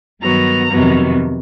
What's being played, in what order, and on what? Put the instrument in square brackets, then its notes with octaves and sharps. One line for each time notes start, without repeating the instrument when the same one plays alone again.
[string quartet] G2 D#3 F#3 B3 A#5
F2 C3 D#3 F#3 B3